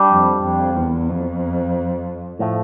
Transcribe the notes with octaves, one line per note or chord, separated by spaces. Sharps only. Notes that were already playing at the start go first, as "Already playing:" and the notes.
Already playing: G3 D4 G4
F2
F2
E2
F2
A2 F3 A3